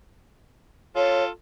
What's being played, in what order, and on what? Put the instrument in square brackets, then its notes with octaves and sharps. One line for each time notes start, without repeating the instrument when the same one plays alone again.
[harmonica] F4 A4 [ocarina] C#5